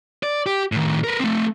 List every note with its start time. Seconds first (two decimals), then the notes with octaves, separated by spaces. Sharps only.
0.23 D5
0.46 G4
0.72 A2 D#3
1.04 A#4 B4
1.19 A3 C4